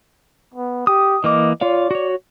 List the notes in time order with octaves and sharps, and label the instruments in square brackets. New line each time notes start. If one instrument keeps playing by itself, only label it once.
[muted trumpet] B3
[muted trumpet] G4 [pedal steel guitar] D#6
[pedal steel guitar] E3 A#3 D6 [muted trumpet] D#5
[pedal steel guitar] F4 C#5 F5 [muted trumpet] D5
[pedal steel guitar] F#4 C#5